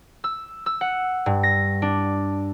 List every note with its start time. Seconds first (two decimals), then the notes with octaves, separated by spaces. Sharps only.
0.24 E6
0.66 E6
0.81 F#5
1.26 G2
1.43 A#6
1.82 D4